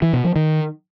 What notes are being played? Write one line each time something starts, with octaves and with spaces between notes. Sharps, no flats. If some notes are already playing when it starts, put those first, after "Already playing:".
E3
B2
F3
D#3